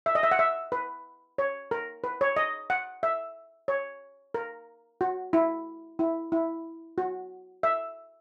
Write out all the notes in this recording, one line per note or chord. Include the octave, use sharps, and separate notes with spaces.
E5
D#5
E5
F#5
E5
B4
C#5
A#4
B4
C#5
D#5
F#5
E5
C#5
A#4
F#4
E4
E4
E4
F#4
E5